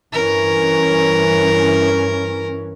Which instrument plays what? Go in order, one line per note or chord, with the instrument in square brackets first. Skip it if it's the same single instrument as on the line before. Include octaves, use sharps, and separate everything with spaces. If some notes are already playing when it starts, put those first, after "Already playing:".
[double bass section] G2 E3 C#4 [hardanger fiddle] A#4